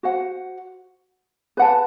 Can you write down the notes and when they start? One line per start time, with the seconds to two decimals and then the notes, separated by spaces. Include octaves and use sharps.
0.03 F#4 C5 F#5
1.57 B4 F#5 A5